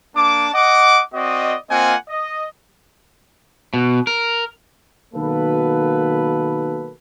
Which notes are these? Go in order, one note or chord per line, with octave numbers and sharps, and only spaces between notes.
A#3 D4 A5 D6
D#5 F#5 D6
C4 F#4 D5 D#5
A#3 C4 F4 D#5 F#5 G#5
D#5
B2
A#4
B1 D#3 A#3 F#4 A4 B4